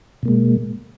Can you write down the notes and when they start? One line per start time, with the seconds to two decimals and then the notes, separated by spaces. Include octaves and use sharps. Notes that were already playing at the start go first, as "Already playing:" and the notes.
0.23 B2
0.25 A#3
0.28 G#3